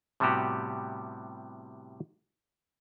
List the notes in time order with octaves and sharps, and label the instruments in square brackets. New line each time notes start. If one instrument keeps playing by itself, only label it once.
[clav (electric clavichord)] A2 C3 G3 B3 F#4 G4